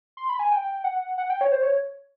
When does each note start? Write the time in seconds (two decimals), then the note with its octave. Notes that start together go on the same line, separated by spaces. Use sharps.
0.17 C6
0.29 B5
0.39 G#5
0.51 G5
0.84 F#5
1.18 F#5
1.30 G5
1.41 C#5
1.52 C5
1.63 C#5